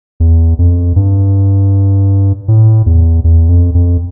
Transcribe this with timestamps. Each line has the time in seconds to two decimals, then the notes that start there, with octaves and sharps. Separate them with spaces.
0.20 E2
0.59 F2
0.96 G2
2.48 A2
2.86 E2
3.24 E2
3.49 F2
3.75 F2